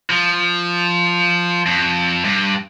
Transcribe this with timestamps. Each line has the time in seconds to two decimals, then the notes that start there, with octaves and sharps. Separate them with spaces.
0.10 F3
1.66 F2
2.24 G2